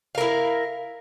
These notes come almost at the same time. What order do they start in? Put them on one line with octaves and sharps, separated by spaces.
F5 A#4 E4